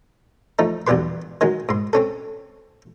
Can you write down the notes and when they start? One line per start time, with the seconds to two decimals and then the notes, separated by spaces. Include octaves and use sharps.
0.59 F3 A3 D#4
0.87 B1 E2 G3 G4 B4 C6
1.41 D#3 F#3 G#3
1.69 G#2 C6
1.93 C4 C#4 A4